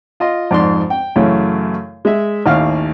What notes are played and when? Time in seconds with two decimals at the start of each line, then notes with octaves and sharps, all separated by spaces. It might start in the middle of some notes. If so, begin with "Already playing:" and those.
0.20 F4 D#5 C6
0.51 F2 G#2 D5 C6
0.90 G5
1.16 F#2 C#3 E3 A3
2.05 G#3 E5
2.46 A1 D#2 F5 F6